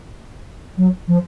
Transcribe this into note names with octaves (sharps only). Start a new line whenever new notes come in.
F#3
F3